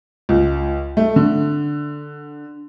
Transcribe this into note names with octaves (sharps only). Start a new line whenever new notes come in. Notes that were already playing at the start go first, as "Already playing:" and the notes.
C#2
A3
D3